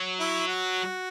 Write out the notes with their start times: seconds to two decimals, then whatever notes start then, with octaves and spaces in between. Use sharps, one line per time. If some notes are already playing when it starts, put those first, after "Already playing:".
Already playing: F#3
0.20 E4
0.48 F#4